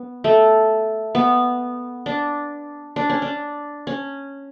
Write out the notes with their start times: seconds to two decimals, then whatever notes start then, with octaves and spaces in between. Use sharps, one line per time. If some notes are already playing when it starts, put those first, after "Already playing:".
Already playing: B3
0.24 A3
1.15 B3
2.06 D4
2.96 D4
3.09 C#4
3.22 D4
3.87 C#4